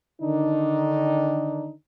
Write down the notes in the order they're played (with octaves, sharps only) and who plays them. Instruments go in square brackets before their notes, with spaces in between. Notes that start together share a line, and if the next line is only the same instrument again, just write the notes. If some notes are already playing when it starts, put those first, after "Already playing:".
[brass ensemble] D3 D#3 D4 D#4